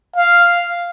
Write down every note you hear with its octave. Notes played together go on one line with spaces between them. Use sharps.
F5